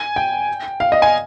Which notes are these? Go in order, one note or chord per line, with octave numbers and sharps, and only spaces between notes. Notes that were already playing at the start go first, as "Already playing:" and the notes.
Already playing: G#5
G5
F5
D#5
G#5